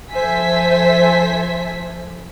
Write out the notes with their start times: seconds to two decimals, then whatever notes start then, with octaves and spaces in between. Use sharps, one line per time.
0.11 F3 A4 C5 E5 G#5 B6